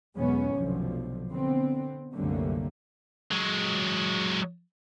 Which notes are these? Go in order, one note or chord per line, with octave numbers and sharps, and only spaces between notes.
B1 E2 G#2 B3 C#4
F1 B1 D3 F3
D3 B3 C4
C2 F#2 D3 A3 A#3
F#3 G#3